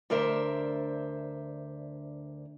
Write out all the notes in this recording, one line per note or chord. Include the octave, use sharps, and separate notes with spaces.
D2 D4 A#4 C5 E5